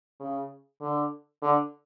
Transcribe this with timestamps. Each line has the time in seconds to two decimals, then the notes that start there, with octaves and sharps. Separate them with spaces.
0.20 C#3
0.81 D3
1.42 D3